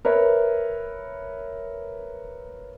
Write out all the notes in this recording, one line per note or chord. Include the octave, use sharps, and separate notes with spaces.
A#4 B4 C#5 E5